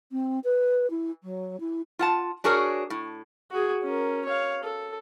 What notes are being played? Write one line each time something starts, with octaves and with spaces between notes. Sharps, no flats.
C4
B4
E4
F#3
E4
F4 F#5 A5
D4 F#4 G#4 A#4 C#5
A2
F#4 G#4
C#4 A#4
C#5 F5
A4